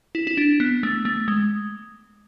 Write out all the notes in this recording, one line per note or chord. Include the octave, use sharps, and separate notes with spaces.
E4
E4
D4
B3
A3
A3
G#3